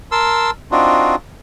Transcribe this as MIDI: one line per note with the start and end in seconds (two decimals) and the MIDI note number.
0.12 0.51 70
0.12 0.51 81
0.12 0.51 84
0.12 0.51 88
0.71 1.15 60
0.71 1.15 62
0.71 1.15 63
0.71 1.15 65
0.71 1.15 66